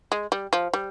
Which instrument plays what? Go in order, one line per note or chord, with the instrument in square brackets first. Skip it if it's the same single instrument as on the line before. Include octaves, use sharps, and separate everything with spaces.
[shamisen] G#3
G3
F3
G3